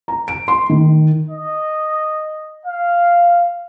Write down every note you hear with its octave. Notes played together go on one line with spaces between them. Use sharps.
A#5
D7
C6
D#3
D#5
F5